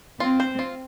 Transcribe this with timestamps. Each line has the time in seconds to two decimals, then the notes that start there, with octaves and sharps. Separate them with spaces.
0.20 C4 F4
0.40 C5
0.59 F4